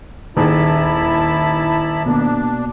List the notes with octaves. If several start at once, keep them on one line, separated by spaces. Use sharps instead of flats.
D#1 D#2 E4 G#4 A5 B5
B2 A#3 D4